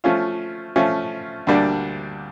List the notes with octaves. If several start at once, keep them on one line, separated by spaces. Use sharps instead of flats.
F3 A3 C#4 F4
F3 A3 C#4 F4
D2 D3 G3 A#3 D4